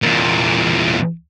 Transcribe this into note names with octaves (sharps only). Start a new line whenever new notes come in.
E2 A#2